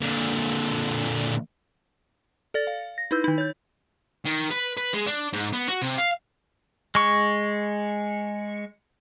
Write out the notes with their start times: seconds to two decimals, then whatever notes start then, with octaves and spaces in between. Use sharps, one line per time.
0.01 A#2 D3
2.54 A4 D5 A6
2.67 F5
2.98 A#6
3.11 D#4 E4 B4 E6 G6
3.24 D#3 D#4
3.38 C#5 G6
4.25 D#3
4.51 B4
4.77 B4
4.94 G#3
5.07 D4
5.33 G#2
5.53 B3
5.69 F#4
5.82 C3
5.98 F5
6.95 G#3 C#6